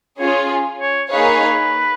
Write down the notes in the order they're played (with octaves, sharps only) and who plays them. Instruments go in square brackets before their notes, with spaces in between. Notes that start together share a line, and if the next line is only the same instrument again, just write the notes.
[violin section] C#4 F4 G#4 [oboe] C#5
[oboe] C#5
[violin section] A#3 D#4 G#4 C#5 F5 [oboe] B4